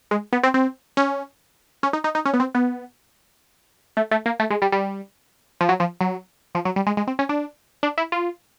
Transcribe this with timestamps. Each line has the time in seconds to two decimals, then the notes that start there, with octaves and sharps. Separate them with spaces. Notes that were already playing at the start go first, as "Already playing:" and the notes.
0.11 G#3
0.33 B3
0.43 C4
0.54 C4
0.97 C#4
1.83 C#4
1.93 D#4
2.04 D#4
2.15 D#4
2.25 C#4
2.33 B3
2.40 C4
2.55 B3
3.97 A3
4.11 A3
4.26 A#3
4.40 A3
4.50 G#3
4.62 G3
4.72 G3
5.61 F3
5.69 F#3
5.80 F3
6.01 F#3
6.55 F3
6.65 F#3
6.76 G3
6.87 G#3
6.97 G#3
7.07 C4
7.19 C#4
7.29 D4
7.83 D4
7.98 E4
8.12 F4